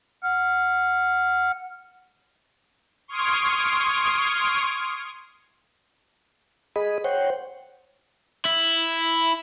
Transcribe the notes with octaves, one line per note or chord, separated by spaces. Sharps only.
F#5 F6
C6 C#6 D#6 F6 G#6 D7
G#4 D#5 B5
C5 C#5 F#5 G5
E4